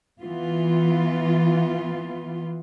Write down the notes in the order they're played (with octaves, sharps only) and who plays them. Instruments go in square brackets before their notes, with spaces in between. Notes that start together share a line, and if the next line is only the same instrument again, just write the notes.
[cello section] E3 B3 F4